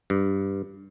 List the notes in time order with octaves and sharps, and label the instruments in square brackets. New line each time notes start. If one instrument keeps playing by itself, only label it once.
[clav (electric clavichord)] G2